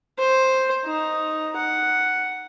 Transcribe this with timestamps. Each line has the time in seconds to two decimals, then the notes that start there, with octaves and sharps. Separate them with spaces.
0.19 C5
0.86 D#4
1.57 F#5